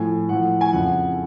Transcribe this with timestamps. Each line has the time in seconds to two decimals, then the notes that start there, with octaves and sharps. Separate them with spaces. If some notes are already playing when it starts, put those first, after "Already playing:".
Already playing: A2 F3 G#5
0.29 A2 F3 F#5
0.61 G#5
0.73 F2 C#3 F3 F#5